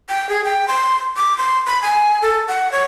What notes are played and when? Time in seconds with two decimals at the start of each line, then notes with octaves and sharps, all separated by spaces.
0.09 G5
0.29 G#4
0.44 G5
0.68 C6
1.16 D6
1.38 C6
1.67 B5
1.82 G#5
2.22 A4
2.48 F#5
2.72 C#5